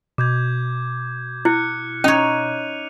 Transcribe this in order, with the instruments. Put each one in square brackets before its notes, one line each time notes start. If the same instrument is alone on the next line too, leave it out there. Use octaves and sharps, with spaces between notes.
[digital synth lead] B2 [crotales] D6 G6 G#6
[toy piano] E4 [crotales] F6 F#6 C#7
[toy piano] C#4 [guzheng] D#4 C#5 [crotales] D#7 F7